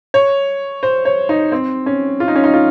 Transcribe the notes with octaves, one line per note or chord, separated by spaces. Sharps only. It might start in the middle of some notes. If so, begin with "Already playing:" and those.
C#5
C5
C#5
D#4
C4
C#4
F4
D#4
C#4
D#4
F4